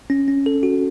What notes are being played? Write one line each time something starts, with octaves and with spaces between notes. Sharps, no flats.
C#4
C#4
A4
F#4